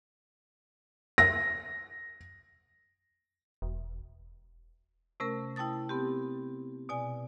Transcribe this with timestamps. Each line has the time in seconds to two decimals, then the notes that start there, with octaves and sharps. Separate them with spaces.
1.18 A#6
3.62 E1
5.20 C3 A3 C#4 A#4
5.56 E4 G5 A5 D#6 A6
5.89 B3 C4 G4
6.89 B2 D5 G#5